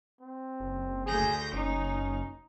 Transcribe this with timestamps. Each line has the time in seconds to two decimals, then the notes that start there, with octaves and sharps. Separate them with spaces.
0.21 C4
0.60 F#1
1.06 D2 G#4 G6 A#6
1.53 F#1 C#4 D#4